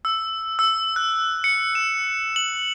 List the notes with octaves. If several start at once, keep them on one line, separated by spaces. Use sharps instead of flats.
E6
E6
F#6
C#7
E7
F#7